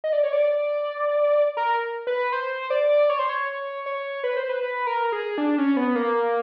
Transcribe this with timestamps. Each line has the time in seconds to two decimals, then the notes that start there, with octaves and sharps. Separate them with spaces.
0.04 D#5
0.13 D5
0.24 C#5
0.33 D5
1.57 A#4
2.07 B4
2.32 C5
2.70 D5
3.10 C#5
3.19 C5
3.29 C#5
3.86 C#5
4.24 B4
4.37 C5
4.49 B4
4.63 B4
4.87 A#4
5.12 G#4
5.38 D4
5.58 C#4
5.77 B3
5.95 A#3